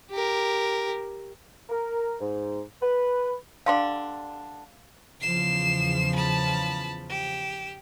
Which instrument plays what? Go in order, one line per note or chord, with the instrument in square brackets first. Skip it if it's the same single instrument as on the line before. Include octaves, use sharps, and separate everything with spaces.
[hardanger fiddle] G4 A#4
[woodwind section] A#4
G#2
B4
[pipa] D3 G3 D4 [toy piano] F5 C6
[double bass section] E2 C#3 F3 [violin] C7 E7
[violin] A5 B5
G4 E7